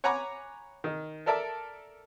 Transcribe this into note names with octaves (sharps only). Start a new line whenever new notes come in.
C#5 F#5 G#5 A#5 B5 D6
D#3
A4 A#4 D5 E5 A5